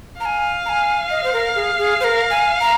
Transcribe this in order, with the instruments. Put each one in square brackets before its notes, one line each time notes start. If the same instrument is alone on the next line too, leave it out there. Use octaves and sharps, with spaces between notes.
[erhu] F5 [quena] G#5 A#5
[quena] A#5
G#5
D#5
C5
A#4
G#4
G#4
C5
A#4
G#5
A#5